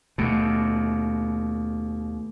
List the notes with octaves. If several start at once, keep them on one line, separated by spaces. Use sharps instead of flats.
D#2 B2 A3